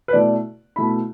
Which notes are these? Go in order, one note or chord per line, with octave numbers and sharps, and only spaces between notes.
B4
B2 A3 E4 D5
B2 A3 E4 B5